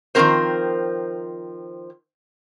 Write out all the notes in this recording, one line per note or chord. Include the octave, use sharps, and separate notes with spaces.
D#3 F3 G#3 C4 A#4 C5